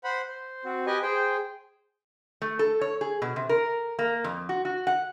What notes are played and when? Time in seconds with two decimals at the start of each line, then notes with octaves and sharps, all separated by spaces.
0.04 C5 F#5 B5
0.28 C5
0.65 C4 F#4
0.87 G4 B4 D#5 G#5
1.02 G#4 C5 G5
2.42 A3
2.59 A4
2.81 C#5
3.01 G#4
3.22 B2
3.36 C3
3.49 A#4
3.99 A#3
4.24 F2
4.49 F#4
4.65 F#4
4.87 F#5